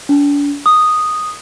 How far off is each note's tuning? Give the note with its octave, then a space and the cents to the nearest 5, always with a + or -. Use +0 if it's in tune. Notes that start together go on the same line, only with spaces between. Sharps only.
D4 -40
D#6 -5